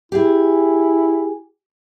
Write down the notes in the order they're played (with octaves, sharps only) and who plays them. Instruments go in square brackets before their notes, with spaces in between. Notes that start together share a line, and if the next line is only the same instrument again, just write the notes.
[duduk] E4 [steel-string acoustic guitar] G4 G#4 G#5